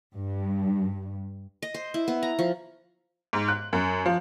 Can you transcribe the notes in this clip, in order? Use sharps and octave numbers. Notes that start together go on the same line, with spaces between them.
G2
D#5
C5
E4
B3
A#5
F3
G#2
F#6
F#2
F3